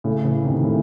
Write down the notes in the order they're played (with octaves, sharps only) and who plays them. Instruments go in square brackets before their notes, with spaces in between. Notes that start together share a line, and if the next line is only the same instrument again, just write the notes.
[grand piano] A2 C#3
C#3 E3
C3 D#3
A2 C#3